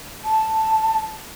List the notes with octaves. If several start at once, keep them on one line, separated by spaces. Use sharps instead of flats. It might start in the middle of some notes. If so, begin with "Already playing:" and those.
A5